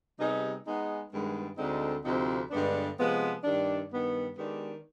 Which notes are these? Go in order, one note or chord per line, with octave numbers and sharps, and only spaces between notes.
C3 G3 B3 D#4 G#4
G#3 B3 D#4 G#4
G2 D#3 G#3 B3
D2 D3 G#3 C4 D#4
D2 C3 F3 C4 D#4
G2 D3 G#3 B3 D4
C3 F3 G#3 B3
G2 D#3 G3 D4
G2 D#3 B3
D#3 G#3 B3 D4 G4